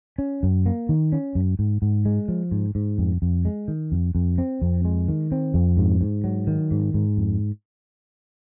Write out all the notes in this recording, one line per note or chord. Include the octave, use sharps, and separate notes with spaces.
C#4
F#2
A#3
D#3
C#4
F#2
G#2
G#2
G#3
F3
G#2
G#2
F2
F2
G#3
D#3
F2
F2
C4
F2
G#3
D#3
C4
F2
G#2
G#2
F#3
D#3
G#2
G#2
F2